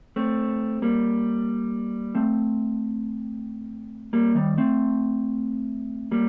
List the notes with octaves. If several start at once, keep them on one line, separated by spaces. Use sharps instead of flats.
A3 C4
G3 A#3
A3 C4
G3 A#3
D#3 G3
A3 C4
G3 A#3